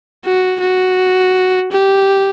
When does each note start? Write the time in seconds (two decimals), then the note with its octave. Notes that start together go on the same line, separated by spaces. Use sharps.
0.25 F#4
0.61 F#4
1.72 G4